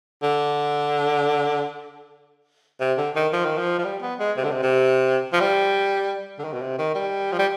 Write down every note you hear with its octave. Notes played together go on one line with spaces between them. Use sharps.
D3
C3
D3
D#3
F3
D#3
F3
F3
G3
B3
G#3
C3
D3
C3
C3
F3
G3
D3
D#3
B2
C3
D#3
G3
F3
G3